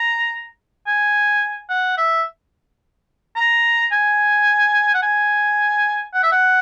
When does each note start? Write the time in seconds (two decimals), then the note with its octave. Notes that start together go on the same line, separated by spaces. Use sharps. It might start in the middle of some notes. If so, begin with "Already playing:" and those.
Already playing: A#5
0.87 G#5
1.70 F#5
1.98 E5
3.36 A#5
3.92 G#5
4.94 F#5
5.03 G#5
6.14 F#5
6.23 E5
6.32 F#5